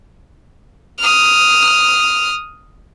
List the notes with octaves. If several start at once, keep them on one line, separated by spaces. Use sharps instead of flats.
D#6 F6